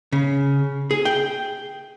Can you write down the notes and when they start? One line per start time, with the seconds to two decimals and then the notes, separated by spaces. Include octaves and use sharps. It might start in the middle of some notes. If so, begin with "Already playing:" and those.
0.12 C#3
0.91 G#4
1.05 G5